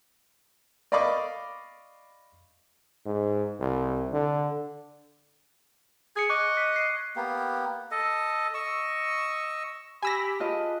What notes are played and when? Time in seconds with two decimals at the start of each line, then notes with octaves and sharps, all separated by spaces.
0.92 D5 D#5 F5 B5 C#6 D6
3.05 G#2
3.60 C2
4.13 D3
6.16 G#4 G#6 C#7
6.30 D#5 C#6 D6 F#6
6.57 F#6 B6
6.76 C7
7.16 A#3 B3 G4
7.91 A4 D#5
8.54 D#5 C#6 E6
10.03 G4 G#5 B5 E6 A#6
10.40 F4 G#4 B4 D#5 A5